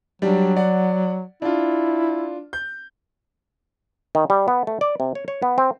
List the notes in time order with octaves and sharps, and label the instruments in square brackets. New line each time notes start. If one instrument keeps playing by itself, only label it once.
[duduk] F#3 [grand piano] G3 D4
[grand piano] D5 F#5
[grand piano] D4 F4 [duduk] E4
[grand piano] G6
[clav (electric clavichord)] D#3
G3
B3
A3
D5
C3
C#5
C#5
B3
C4